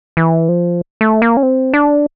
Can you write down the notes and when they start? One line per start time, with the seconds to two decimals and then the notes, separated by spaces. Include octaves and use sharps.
0.17 E3
0.49 F3
1.01 A3
1.22 A#3
1.37 C#4
1.43 C4
1.74 D4